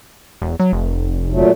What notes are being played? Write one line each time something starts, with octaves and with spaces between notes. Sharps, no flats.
E1
F#3
F1
A#2 F#3 A3